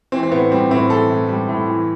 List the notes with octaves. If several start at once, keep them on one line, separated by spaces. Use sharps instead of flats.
E3 C4
C4
A2 B3
G3 C4
A2 C4
E3 A4
A2
G3
A2
E3